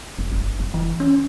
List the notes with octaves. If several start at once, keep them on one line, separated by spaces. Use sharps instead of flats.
F1
G1
F1
E3
C#4